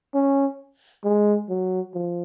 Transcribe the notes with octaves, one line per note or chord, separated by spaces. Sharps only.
C#4
G#3
F#3
F3